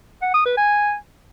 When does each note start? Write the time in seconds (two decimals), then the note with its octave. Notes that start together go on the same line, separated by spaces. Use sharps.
0.22 F#5
0.34 D#6
0.45 B4
0.57 G#5